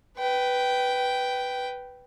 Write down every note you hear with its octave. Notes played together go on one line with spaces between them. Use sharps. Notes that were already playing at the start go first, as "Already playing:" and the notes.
B4 G5